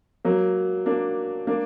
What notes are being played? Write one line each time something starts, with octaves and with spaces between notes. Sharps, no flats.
F#3 A#3
A#3 D4
A#3 D4